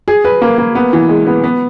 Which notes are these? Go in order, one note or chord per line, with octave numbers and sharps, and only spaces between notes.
G#4
B4
A#3
A#3
B3
E3
G#3
B3
B3